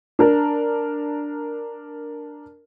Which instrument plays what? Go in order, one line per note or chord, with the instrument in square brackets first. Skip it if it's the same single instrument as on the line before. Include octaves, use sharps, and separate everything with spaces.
[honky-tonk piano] D4 A#4